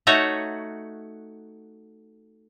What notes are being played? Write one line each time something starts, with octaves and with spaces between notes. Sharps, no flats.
A3 D#4 F#4 C#5